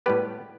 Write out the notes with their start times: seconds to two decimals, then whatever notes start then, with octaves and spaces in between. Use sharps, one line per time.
0.06 A2 G3 B3 G4 B4